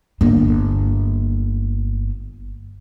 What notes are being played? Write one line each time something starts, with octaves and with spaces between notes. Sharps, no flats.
G1 A#3